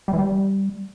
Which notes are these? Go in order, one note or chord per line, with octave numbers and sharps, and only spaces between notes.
G3
E3
G3